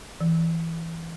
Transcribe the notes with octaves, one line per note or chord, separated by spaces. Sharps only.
E3